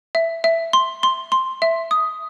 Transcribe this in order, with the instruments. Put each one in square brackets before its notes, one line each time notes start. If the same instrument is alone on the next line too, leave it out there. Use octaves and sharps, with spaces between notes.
[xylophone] E5
E5
C6
C6
C6
E5
D#6